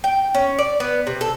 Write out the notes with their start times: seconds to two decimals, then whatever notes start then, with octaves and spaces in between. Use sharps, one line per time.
0.04 G5
0.35 C#4
0.58 D5
0.80 B3
1.07 C3
1.21 A4